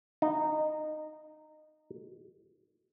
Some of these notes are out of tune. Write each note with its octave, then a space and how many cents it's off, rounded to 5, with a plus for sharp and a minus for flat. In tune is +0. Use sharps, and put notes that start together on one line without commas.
D#4 -15